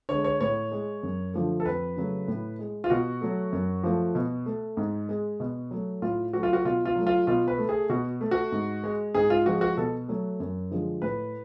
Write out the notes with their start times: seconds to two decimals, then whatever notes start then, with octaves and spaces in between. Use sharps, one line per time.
0.09 D3 G#3 C#5
0.24 C#5
0.41 A2 C#5
0.72 G#3
1.03 F#2
1.34 D3 F3 A3
1.60 A4
1.65 F2 B4
1.96 C#3 F#3 A3
2.28 A2
2.59 G#3
2.84 F4
2.90 B2 F#4
3.21 F#3 A3
3.52 F#2
3.84 F3 A3
4.15 B2
4.46 A3
4.77 G#2
5.09 G#3
5.40 B2
5.71 F#3 A3
6.02 A2 F4
6.33 F#3 A3 F#4
6.43 F4
6.53 F#4
6.65 B2 F4
6.85 F4
6.95 F#3 A3
7.07 F4
7.27 B2 F4
7.48 B4
7.58 A3
7.69 G#4
7.89 B2 F#4
8.21 A3
8.31 F#4
8.52 G#2
8.84 G#3
9.14 G#2 G#4
9.30 F4
9.46 F3 G#3 F#4
9.61 F#4
9.77 B2 A4
10.08 F#3 A3
10.40 F#2
10.71 D3 F3 G#3
11.02 A2 B4